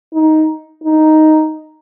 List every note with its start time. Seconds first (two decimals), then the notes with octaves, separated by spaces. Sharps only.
0.14 D#4
0.84 D#4